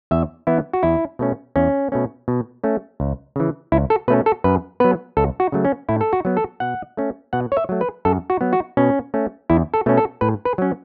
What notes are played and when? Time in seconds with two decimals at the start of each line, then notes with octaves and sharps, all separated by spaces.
0.11 E2 E5
0.47 E3 B3 E4
0.73 F#4
0.83 E2 E4
1.19 B2 A3 C#4
1.56 E2 C#4
1.92 B2 A3 C#4
2.28 B2
2.64 A3 C#4
3.00 C#2
3.36 C#3 E3
3.72 C#2 E4
3.90 A4
4.08 B2 A3 C#4 B4
4.26 A4
4.44 F#2 B4
4.80 F#3 B3 B4
5.17 C#2 A4
5.40 F#4
5.52 C#3 F#3 A3
5.65 C#4
5.89 A2 E4
6.01 A4
6.13 F#4
6.25 F#3 B3
6.37 A4
6.60 B2 F#5
6.97 A3 C#4
7.33 B2 F#5
7.52 C#5
7.57 E5
7.69 F#3 A3
7.81 B4
8.05 F#2 A4
8.30 F#4
8.41 F#3 B3
8.53 F#4
8.77 B2 C#4
9.14 A3 C#4
9.50 E2 E4
9.74 A4
9.86 B2 A3 C#4
9.97 A4
10.21 A2 B4
10.45 B4
10.58 F#3 C#4